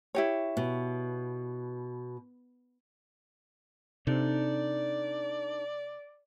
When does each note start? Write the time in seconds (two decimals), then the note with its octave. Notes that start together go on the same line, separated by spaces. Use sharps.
0.15 E4 G4 C#5
0.57 B2
4.07 C3 D4 D#4 A4 D5